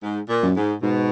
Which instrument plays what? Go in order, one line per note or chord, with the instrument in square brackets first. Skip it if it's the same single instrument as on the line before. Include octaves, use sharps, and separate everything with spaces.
[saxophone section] G#2
A#2
[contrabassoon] F#2
[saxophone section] G#2
[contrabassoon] G#2 [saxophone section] B2